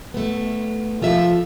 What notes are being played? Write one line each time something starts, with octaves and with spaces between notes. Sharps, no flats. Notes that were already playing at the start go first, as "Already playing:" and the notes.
A3 B3
F3 F4 A4 E5